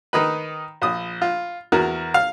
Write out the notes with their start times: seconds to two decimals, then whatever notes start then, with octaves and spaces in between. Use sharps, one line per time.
0.13 D#3 D#4 B4
0.82 A#1 D#6
1.22 F4
1.72 E2 F#4 A#4
2.14 F5